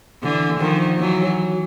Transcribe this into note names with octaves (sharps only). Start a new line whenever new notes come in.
D3 E3
D#3 F3
E3 F#3